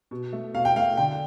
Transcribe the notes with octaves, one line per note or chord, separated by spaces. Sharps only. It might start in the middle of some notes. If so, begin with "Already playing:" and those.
B2
A3
B2 F5
G5
A3 F5
D3 G5